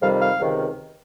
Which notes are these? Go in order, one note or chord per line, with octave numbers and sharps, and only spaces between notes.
F2 C3 D#3 G3 F5
F5
C#2 C3 D#3